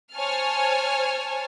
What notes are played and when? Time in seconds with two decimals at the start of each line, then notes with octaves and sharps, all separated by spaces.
0.14 C5 C#5 G#5 A5 F6